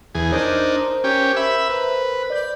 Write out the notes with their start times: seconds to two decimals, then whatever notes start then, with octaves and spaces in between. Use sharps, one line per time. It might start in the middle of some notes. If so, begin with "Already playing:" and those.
0.15 E2 G#4
0.32 D4 D#4 A#4 C5
1.04 C#4 G4
1.37 E5 B5
1.69 B4
2.30 D5 G6